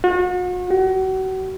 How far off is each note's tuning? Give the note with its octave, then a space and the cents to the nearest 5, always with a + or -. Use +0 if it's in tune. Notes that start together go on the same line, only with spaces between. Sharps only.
F#4 -40
F#4 +35